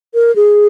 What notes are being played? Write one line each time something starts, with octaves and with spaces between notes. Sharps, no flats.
A#4
G#4